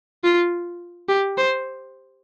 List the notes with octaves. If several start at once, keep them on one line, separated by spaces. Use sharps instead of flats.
F4
G4
C5